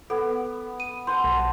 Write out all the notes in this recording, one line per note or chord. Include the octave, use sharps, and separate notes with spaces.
B3 A4
D#7
C5 F#5 A5 C6
B1